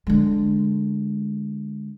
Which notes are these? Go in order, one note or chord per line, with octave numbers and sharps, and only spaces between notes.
D3 G#3